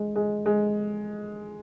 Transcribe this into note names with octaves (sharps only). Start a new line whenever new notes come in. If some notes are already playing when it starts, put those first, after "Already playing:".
Already playing: G#3
G#3
G#3